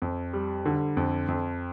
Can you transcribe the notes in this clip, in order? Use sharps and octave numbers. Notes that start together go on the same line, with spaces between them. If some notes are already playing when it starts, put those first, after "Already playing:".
F2
G3
D3
F2
F2